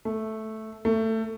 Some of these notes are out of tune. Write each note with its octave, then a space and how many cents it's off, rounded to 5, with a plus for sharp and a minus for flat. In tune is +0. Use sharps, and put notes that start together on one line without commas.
A3 -5
A3 +20